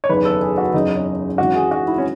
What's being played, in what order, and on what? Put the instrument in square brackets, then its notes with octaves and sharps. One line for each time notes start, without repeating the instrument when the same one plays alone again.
[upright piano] C#5
F#1 E2 D#3 B4
A4
G#4
F#4
F#1 E2 C#3 F#3 D#4
C#4
G#1 F#2 E3 F#4
G#4
F#4
E4
C#4